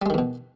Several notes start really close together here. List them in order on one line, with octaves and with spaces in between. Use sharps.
G3 G#3 D#3 E2 B2